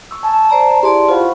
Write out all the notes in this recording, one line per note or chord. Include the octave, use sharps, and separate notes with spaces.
C#6 E6
G#5 A5
C5 D5 A#5
E4 G4 G#4 D5 A5 C6
F4 C5 F5 F#5 B5 C#6